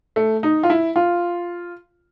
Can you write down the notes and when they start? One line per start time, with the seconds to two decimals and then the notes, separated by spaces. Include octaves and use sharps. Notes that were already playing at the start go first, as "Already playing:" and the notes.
0.16 A3
0.43 D#4
0.63 F4
0.70 E4
0.96 F4